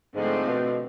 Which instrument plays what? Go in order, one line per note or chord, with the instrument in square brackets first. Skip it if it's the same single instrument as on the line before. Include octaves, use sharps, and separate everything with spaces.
[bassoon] G#2 [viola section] D3 F3 A3 C4
[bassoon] B2